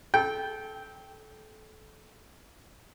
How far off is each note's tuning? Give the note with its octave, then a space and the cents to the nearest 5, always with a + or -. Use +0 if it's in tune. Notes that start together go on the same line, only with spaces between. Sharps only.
A4 -25 G5 +0